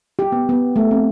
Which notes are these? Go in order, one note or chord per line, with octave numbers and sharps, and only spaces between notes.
G4
B3
B3
A3
C4